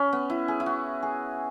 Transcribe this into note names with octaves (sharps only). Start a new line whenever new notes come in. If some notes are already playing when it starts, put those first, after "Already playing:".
Already playing: C#4
B3
E4
G#4
E4
F#4
G#4